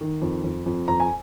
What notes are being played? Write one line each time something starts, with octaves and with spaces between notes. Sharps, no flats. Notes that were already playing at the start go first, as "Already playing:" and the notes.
D#3
F2
F2
F2
F2 A#5
G#5